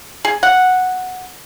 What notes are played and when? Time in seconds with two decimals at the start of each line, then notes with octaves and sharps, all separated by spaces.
0.25 G#4
0.43 F#5